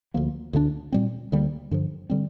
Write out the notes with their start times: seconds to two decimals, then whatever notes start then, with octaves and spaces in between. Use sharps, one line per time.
0.14 D2 D3 F3 A#3
0.53 D2 D3 A#3 D4
0.92 A#2 G3 C4
1.32 D2 D3 G3 A#3
1.71 G2 D3 F3
2.10 D3 G3 C4